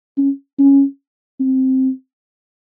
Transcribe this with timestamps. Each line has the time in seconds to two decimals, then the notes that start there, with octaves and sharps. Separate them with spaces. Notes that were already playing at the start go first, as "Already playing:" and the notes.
0.18 C#4
0.59 C#4
1.40 C4